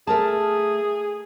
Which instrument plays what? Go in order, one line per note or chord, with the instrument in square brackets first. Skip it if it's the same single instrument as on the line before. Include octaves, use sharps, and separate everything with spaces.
[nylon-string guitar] A3 A#4 A5 [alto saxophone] G#4